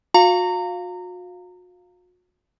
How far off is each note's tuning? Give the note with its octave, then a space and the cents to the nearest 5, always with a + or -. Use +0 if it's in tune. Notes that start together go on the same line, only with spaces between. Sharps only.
F#4 -40 F5 +0 A#5 -30